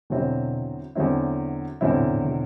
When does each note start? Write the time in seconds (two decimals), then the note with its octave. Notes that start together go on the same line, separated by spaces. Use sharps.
0.10 E2 B2 D3 F#3 C4 E4
0.95 E2 D3 F#3 C4 E4
1.81 E2 A2 D3 F#3 C4 E4
1.89 B2
1.96 A2
2.03 B2
2.11 A2
2.24 B2